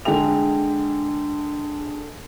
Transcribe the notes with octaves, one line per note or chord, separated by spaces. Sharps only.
D3 G#3 G#4 G5 F7